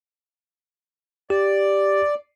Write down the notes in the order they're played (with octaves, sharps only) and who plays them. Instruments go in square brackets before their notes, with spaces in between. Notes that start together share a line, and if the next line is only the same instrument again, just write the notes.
[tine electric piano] G4 [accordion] D5